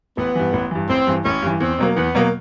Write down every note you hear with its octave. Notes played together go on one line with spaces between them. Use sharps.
A1 B3
G2 E3
A1
G2 E3
A1 C4
G2 E3
A1 C#4
G2 E3
E2 C4
B2 F#3 A#3
E2 B3
B2 F#3 A#3